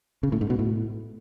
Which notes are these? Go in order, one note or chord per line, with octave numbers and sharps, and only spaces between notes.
C#3
A2
G#2
B2
A2